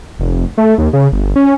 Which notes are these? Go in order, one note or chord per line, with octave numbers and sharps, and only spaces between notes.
F1
A3
D#2
C#3
G1
C#4